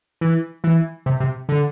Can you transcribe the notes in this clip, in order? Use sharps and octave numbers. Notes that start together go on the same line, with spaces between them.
E3
E3
C3
C3
D3